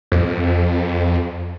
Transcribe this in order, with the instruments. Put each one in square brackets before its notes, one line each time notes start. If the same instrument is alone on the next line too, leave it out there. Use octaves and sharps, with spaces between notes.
[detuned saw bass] F2